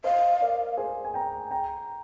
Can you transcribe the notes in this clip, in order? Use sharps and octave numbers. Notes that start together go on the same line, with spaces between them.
C5 D#5 F5
A#4 D5
G#4 C5
G#5
G5 A#5
G5 A#5